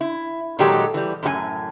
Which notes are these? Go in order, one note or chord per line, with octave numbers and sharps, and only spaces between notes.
E4
A#2 D#3 F#3 G#3 G4 A4
E3 G3
F#2 A2 F#4 G#5